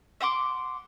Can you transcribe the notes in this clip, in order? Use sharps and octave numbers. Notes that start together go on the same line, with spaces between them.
E5 F#5 C6 D6